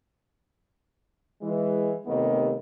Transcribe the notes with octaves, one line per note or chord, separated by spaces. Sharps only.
E3 G#3
D#2 C3 D#3 A3 B3 D#5